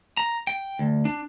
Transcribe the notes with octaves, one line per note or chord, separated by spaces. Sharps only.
A#5
G5
D2
D4